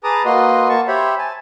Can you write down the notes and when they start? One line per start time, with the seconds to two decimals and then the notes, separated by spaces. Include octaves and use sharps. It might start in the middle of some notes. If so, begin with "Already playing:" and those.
0.04 G#4 B4 A5 A#5 D6 D#6
0.25 A#3 F#4 B4 D#5 C6
0.69 A#3 A5 C#6
0.88 G4 C5 C#5 E5 B5
1.18 G#5 A5